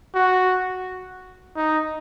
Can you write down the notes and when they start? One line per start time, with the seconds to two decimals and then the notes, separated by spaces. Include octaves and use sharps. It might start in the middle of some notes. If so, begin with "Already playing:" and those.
0.15 F#4
1.57 D#4